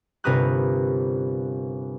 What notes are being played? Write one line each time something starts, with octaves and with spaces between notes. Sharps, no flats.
G1 C3 A#4 B4 D#6 F#6